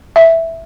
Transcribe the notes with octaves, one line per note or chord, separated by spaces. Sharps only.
E5